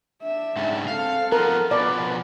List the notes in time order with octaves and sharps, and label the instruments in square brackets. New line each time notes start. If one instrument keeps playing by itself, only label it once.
[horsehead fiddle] D4 E5
[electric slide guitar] G#2 C#3 G3
[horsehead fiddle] C4 A4 [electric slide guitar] F5
[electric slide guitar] F3 B3 [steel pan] A#4
[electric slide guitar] B2 F3 [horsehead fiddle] B4 [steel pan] D5